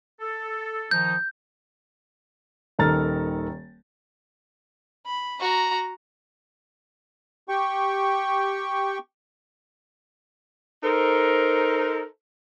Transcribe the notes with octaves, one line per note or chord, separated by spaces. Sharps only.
A4
D#3 F3 D#4 G6
D#1 D#3 A4 A#5 F6 A6
B5
F#4 A#5
G4 G5 C#6
D#4 A4 A#4 C5